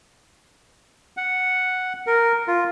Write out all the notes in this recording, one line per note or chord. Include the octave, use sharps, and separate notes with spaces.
F#5
A#4
F4